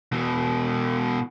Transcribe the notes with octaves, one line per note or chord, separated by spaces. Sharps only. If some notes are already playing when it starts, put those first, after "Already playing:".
B2 E3